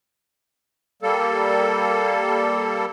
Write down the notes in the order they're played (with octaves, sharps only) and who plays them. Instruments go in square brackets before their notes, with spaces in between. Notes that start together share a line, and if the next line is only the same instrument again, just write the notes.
[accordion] G3 A#3 A4